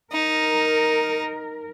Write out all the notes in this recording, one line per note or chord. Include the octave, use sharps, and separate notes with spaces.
D#4 A#4